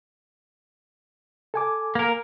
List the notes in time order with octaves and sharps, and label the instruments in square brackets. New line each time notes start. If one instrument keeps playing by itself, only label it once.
[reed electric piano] A4 G#5 D6
[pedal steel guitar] A#3 A#4